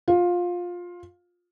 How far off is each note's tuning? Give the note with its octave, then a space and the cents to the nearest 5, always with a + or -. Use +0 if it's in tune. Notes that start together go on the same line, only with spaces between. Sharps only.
F4 +15